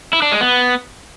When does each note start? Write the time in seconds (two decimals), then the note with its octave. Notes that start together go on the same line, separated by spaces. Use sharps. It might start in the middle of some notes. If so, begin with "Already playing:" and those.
0.13 E4
0.22 D4
0.32 G#3
0.41 B3